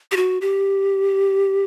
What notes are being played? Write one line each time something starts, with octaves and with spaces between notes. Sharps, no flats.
G4
F#4
G4